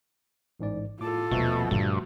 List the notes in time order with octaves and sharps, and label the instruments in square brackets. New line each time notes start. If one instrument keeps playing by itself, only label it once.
[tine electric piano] A1 G#2 D5
[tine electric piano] A2 D6 [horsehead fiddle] F4 A4
[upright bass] D#1 C#4 [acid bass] B2 [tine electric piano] F3 A3 F#4
[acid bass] G2 [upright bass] A#2 D3